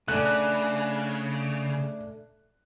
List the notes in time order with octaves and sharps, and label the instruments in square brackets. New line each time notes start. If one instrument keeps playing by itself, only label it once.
[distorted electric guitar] C#3 [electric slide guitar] A3 D4 [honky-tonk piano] F#6